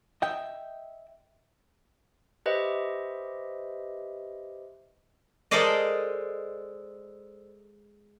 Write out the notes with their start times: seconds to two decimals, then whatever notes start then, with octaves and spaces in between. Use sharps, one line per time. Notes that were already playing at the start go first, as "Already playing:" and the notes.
0.22 D#5 E5 G5
2.46 G4 B4 C5 D#5 E5
5.51 G#3 A4 A#4 C5 D5 D#5